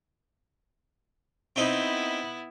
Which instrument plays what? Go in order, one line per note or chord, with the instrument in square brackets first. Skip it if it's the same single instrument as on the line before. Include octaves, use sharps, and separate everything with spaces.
[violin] B3 E4 [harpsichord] C4 D#4